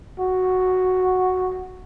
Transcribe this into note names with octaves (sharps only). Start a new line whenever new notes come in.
F#4